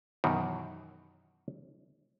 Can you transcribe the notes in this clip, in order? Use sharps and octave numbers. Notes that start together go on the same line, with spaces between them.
F#2 B2 D#3 E3